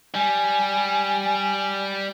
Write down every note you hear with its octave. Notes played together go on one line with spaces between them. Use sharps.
G3 G#5